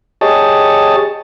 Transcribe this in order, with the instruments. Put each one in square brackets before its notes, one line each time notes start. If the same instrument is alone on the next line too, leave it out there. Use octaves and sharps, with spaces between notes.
[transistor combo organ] G4 G#4 C#5 D#5 A5